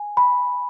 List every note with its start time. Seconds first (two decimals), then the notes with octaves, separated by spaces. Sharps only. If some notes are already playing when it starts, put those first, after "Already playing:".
Already playing: G#5
0.17 B5